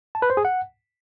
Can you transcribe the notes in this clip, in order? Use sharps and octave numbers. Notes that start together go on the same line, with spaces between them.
A5
B4
C5
G#4
F#5